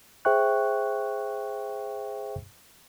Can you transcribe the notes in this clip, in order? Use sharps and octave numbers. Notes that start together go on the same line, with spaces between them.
G#4 C5 E5 G5 C#6 F#6